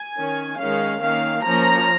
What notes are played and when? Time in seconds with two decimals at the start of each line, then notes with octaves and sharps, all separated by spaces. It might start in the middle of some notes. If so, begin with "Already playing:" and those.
Already playing: G#5
0.17 D#3 C#4
0.59 D#3 G#3 C#4 F5
1.02 D#3 A#3 C#4 F5
1.45 F3 A#3 C#4 A#5